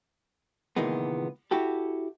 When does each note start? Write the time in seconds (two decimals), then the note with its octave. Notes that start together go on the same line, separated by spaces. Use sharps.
0.76 C#2 A#2 D#3 E3 G#3 B3
1.51 E4 F#4 G4 A4